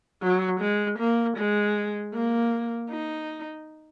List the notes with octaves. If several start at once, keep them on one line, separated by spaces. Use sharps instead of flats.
F#3
G#3
A#3
G#3
A#3
D#4